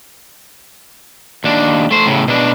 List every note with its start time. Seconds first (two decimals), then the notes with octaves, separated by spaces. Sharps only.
1.44 D#2 D4
1.91 A3 C5
2.06 A2 C#3
2.28 B2 D4